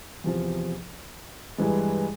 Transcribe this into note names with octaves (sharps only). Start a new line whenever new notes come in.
E2 C3 F3
G2 E3 G#3